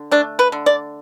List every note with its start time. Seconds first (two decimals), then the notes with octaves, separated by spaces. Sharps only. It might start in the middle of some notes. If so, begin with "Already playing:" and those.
Already playing: D3
0.12 A3 D4
0.39 B4
0.52 D3
0.66 D5